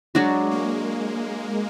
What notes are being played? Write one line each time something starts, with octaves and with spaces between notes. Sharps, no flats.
F#3 G#3 D4 F#4
A#3